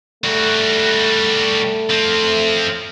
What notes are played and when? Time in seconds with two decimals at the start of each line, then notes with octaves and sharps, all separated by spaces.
0.24 G3 A3 F#4
1.90 F3 C4